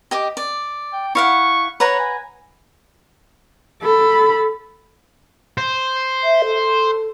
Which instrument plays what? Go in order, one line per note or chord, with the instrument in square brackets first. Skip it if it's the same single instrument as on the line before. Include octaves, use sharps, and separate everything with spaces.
[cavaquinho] G4 D#5 D6
D5
[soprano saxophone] G5
[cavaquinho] E4 F5 F#5 [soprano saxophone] C#6
[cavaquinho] B4 F#5 A#5 [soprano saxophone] C#5
[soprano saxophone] G#5
[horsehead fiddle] A4 B5
[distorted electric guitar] C5
[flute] E5
A4